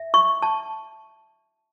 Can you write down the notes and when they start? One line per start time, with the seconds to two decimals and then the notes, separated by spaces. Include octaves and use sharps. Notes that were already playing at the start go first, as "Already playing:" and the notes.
Already playing: E5
0.14 C#6
0.42 A5